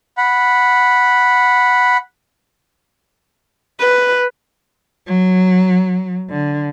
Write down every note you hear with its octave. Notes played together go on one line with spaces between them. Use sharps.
F#5 B5
B4
F#3
D3